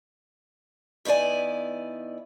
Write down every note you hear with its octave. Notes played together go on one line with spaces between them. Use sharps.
D#3 B3 E4 D5 G#5